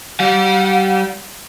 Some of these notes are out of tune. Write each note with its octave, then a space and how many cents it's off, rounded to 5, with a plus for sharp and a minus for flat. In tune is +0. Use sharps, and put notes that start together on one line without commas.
G3 -30 F#5 -40